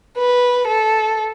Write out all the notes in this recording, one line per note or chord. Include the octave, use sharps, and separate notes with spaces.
B4
A4